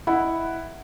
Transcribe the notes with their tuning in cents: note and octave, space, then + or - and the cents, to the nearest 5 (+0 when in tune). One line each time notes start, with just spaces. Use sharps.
E4 +0 D#5 +0 F#5 +5